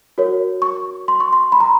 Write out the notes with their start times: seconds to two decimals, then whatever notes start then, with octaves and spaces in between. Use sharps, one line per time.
0.18 F#4 A#4 C#5
0.62 C#6
1.08 C6
1.20 C#6
1.33 C6
1.52 B5
1.60 A#5